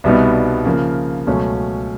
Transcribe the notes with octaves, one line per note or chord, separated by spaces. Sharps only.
C2 B2 G3 B3 D#4
C#3 F3 A#3
C#2 B2 F#3 A3 C#4